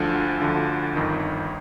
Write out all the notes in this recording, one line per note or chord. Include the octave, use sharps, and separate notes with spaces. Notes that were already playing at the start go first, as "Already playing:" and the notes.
Already playing: D2 D3 F3
D2 D3 F3
G1 F2 D#3